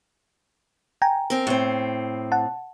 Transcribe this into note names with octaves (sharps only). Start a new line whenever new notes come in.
G5 G#5 A#5
C4 A#4
A2 C4
F#5 A5